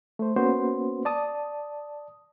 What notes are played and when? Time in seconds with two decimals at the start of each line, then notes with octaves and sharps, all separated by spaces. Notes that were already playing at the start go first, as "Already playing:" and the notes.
0.19 A3 C5
0.36 A#3 B3 C#4 F#4 B4 C5
1.05 D5 A5 D#6